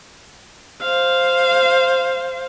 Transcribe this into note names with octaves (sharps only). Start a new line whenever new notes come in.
C5 F5